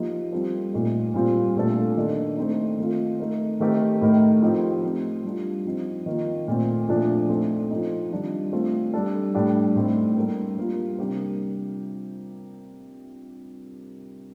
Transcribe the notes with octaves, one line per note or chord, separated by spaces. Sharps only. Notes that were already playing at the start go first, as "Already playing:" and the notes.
Already playing: F3 A#3 D#4 G4 A#4
G3 C4 F4 A4
A#2 A3 C4 D#4
A#2 G3 C4 F4
A#2 A3 D4 F4 A4
D#3 A#3 D4
A3 C4 D#4
D#3 A3 C4 F4
A3 D#4 A#4
D#3 A3 C4 G4 A#4
A2 A3 D#4 A#4
F3 C4 D#4 G4
A3 C4 D#4
G3 D4 F4
F3 C4 D#4
D#3 A#3 F4
A#2 A3 C4
A#2 F3 A3 D4
A3 C4 D#4 A4
F3 C4 D#4
D#3 G3 D4 F4
A3 C4 F4 A4
G3 D4 A4
A2 G3 D4 G4
A2 A3 C4 D#4
G3 A#3 D4 G4 A#4
G3 A#3 F4
C3 G3 D4 G4 A#4